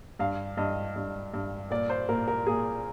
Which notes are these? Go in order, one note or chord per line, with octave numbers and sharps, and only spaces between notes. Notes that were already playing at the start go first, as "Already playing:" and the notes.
G2 F5
G2 D#5
G2
G2
A#2 D5
C5
A#2 A#4
A#4
A#2 G#4